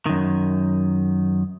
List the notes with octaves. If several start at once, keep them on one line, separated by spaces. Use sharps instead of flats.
F#2 D#3